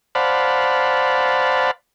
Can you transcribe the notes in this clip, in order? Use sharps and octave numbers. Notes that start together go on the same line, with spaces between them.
C5 D5 F5 F#5 A5 B5